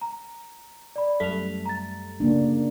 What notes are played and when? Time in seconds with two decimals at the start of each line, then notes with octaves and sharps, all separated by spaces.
0.01 A#5
0.96 D5 B5
1.20 F#2 G3 A3 B6 F7
1.66 A#5 A6
2.20 C#3 A#3 D4